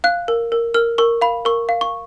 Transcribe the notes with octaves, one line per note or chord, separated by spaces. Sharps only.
F5 F#6
A#4
A#4
A#4 F6
A#4 C#6
F5 B5
A#4 C#6
F5
C#6